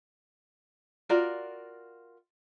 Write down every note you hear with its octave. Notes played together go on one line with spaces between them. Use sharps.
F4 F#4 A#4 D5